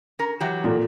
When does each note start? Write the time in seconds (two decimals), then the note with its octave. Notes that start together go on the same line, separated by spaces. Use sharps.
0.19 C#4 A#4
0.40 E3 F#3 G4
0.64 A#2 F4 A4